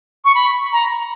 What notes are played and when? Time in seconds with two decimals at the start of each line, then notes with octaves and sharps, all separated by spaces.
0.25 C#6
0.35 B5
0.72 A#5